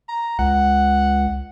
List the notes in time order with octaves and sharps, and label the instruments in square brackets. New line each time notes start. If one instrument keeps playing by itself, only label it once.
[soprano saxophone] A#5
[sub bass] C#2 [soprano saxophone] F#5